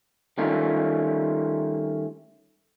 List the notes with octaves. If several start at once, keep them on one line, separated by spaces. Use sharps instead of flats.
D#3 G3 A3 C#4 F4